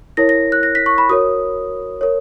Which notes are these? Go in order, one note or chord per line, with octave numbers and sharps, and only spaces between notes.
E4 A#4 C#5 A#6
A#6
F#6
A#6
B6
C#6
B5
F#4 A#4 C#5 D#6
A#4 C#5